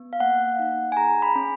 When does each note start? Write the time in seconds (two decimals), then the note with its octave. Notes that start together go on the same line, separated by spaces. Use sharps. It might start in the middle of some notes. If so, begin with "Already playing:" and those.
Already playing: B3
0.13 F5
0.20 A#3 F#5
0.59 D#4
0.92 G#5
0.97 G#4 A#5
1.22 B5
1.36 C#4